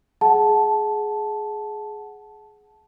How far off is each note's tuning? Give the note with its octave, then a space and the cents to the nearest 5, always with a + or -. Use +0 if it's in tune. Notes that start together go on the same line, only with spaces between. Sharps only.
G#4 +15 F#5 +0 A5 -10